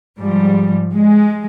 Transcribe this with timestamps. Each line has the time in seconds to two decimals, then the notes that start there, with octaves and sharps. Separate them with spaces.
0.19 G#2 F3 G3
0.94 G#3